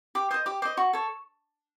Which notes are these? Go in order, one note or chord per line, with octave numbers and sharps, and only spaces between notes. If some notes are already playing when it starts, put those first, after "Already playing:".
G4 D6
C5 D#5 D#6
G4 D6
C5 D#5 D6
F#4 C#6
A4 C#5